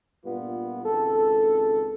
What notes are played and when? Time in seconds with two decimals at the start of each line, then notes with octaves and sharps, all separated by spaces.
0.25 G2 A#2 G3 B3 F4 B4
0.84 G#1 C#2 G#3 A4